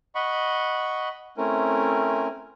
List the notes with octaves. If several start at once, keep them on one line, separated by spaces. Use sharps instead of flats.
D#5 F#5 B5 C#6
A3 C4 C#4 E4 A#4